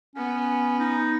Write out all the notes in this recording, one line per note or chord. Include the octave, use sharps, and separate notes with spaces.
B3 C#4
D#4